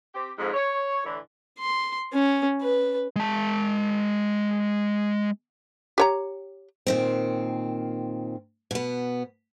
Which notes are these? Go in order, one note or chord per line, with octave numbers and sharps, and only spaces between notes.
C4 G4
F2 G#2
C#5
A2 D3 E3
C6
C#4
B4
G#3 A5
G4 C#5 A#5
A#2 D#3 C4
B2 B3